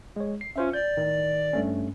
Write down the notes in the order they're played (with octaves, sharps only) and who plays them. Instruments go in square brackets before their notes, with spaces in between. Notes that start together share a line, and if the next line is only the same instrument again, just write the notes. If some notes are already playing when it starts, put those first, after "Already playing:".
[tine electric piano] G#3 C#5
C7
[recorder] C#4 [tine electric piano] F4 C5 E5
[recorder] D5 [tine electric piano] G6
[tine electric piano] A2 D#3
G2 A3 C#4